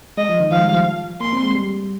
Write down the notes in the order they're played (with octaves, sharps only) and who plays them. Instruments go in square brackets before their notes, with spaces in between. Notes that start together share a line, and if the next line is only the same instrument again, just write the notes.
[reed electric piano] G#3 [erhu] D#5
[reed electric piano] F3
D#3
[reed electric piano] F3 [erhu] F5
[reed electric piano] G#3
G3
F3
[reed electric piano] A#3 [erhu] C6
[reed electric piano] C4
G#3
G3